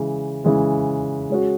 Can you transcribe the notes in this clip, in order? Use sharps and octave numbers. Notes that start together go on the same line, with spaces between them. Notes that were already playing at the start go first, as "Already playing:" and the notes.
Already playing: C#3 E3 G#3
C#3 E3 G#3
G#3 C#4 F#4